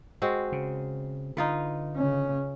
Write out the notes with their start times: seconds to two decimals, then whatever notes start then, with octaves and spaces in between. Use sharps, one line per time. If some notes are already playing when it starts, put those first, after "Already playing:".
0.22 G#3 C4 F#4
0.52 C#3
1.37 D3 D#4 F4 B4
1.96 C#3 C#4